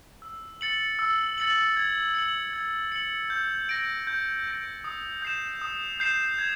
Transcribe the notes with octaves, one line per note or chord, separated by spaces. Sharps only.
E6
A6 C#7 F#7
E6
A6 C#7 F#7
G#6
C#7 F#7
G#6
C#7 F#7
G6
A#6 D7
G6
A#6 D7
D#6
G6 C7 E7
D#6
G6 C7 E7
G#6